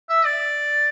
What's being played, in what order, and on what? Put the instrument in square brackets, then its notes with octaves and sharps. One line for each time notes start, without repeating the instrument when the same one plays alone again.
[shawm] E5
D5